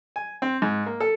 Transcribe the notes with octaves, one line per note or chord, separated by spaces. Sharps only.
G#5
C4
G#2
A#3
A4